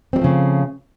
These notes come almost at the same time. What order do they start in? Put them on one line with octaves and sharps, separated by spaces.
C4 G3 A3 F3 C#3